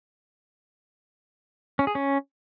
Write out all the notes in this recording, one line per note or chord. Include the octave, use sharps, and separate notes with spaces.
C#4
G#4
C#4